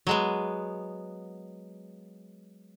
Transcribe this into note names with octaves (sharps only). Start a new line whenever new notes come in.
F#3 G#3 B3